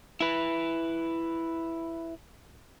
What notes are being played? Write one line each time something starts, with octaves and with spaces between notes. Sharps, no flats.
E4 B4